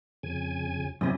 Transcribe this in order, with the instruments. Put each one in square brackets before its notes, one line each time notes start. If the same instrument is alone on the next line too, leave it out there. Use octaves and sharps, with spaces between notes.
[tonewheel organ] F2 C#3 G#5
[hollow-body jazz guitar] F#2 C3 [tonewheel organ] C#4 E4 D#5